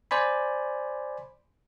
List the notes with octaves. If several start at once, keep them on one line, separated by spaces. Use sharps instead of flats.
C5 D5 G#5 B5